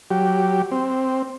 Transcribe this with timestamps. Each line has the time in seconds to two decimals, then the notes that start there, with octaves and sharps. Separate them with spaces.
0.11 F#3 G4
0.71 C4